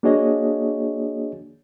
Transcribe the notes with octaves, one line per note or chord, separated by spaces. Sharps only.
A#3 D4 F#4 G#4 C#5 D#5